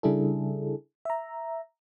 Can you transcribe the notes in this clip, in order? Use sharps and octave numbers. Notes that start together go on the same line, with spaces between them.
C#3 G3 D4 E4 G#4 A4
E5 A#5